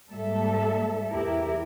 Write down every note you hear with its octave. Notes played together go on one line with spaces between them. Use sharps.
G#2 G3 A#3 A4 E5
E2 E4 G4 A#4